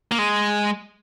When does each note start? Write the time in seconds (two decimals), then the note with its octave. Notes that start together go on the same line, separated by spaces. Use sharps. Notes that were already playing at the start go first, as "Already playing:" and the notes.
0.12 A#3
0.18 G#3